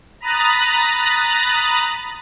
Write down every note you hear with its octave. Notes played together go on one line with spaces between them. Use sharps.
A#5 B5 D#6 F#6 A6 A#6